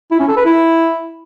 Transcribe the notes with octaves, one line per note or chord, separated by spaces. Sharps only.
E4
C#4
A4
B4
E4